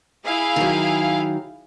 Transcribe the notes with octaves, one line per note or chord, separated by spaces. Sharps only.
E4 G#4 F5
D#3 F#3